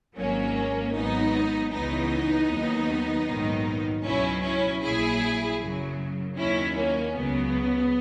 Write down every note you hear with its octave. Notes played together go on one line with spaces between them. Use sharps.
G#1 G#2 F#3 A#3 C#4
G#1 G#2 F#3 B3 D#4
C#2 C#3 E3 B3 D#4
D#2 D#3 F#3
A#1 G#2 D#3 F#3
C#2 B2 F#3 C#4 E4
C#4 E4
A#1 A#2 F#3 E4 G#4
F#2 C#3 F#3
D#2 D#3 F#3 C#4 E4
A#3 C#4
C#2 C#3 F#3 B3